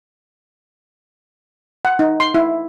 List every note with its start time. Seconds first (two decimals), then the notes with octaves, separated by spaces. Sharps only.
1.85 F#5
1.99 D#4
2.20 C6
2.34 E4